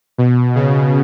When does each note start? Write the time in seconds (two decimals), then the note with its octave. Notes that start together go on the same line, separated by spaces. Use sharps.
0.18 B2
0.55 C#3